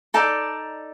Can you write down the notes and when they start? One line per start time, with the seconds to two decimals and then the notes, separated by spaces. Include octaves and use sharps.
0.14 D#4 A4 D5 A5